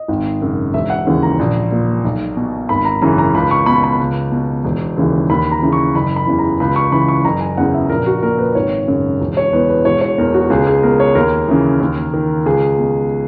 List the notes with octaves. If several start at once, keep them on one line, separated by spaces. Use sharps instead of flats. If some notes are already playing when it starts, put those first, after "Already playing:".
Already playing: D#5
G#1
F#2 C#3
E1 E5
F#5
D#2 C#3 E3
A#5
A#1
A#2
B1
B2
G#1 B5
A#5
F#2 C#3 E3 A#5
A#5
C#2 B5
C#6
B2 B5
B5
C#2
B2
E1
D#2 C#3 E3
D#2 B5
A#5
C#3 E3
C#6
F#1 B5
B5
E2 C#3 E3
A#5
C#2 B5
C#6
C#3 E3 B5
C#6
F#1 A#5
G#5
E2 C#3 F#5
E5
A#1 A#4
F#4
A#2 A#4
B4
G#1 C#5
F#2 C#3
E1
C#5
E2 B2 B4
B4
E1 C#5
C#5
E2 B2 A#4
F#4
C#2 G#4
G#4
B2 A#4
C#5
D#2 A#4
C#3 E3
D#2
D#3
C#2 G#4
B2